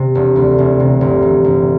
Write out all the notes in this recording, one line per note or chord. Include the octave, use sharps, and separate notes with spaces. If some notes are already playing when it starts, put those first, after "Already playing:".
Already playing: C3
E1
D2
E1
C3
G1
E3
G1